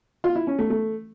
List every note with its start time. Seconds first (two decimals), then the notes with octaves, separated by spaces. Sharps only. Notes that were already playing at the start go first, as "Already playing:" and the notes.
0.24 F4
0.36 E4
0.47 C#4
0.59 A3
0.70 A3